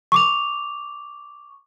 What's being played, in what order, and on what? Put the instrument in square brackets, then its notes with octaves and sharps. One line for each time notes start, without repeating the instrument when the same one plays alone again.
[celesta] C#6 D6 F7